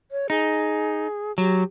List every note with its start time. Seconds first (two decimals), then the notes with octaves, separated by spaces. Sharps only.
0.11 C#5
0.30 D#4 G#4
1.38 F#3 G4